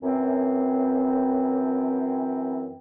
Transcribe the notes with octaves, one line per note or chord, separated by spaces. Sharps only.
F#2 E3 C4